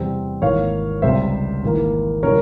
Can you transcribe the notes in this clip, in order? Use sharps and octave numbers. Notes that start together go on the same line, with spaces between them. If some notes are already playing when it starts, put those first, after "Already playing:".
Already playing: E2 C3 G3 C4
G#1 G#2 E3 A#3 C#5 F5
C#2 C3 G3 C4 C5 E5
G#1 G#2 E3 A#3
C#3 E3 G3 C#4 A#4 C#5